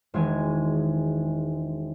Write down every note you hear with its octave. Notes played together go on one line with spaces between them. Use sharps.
E1 D#3 G#3 G#5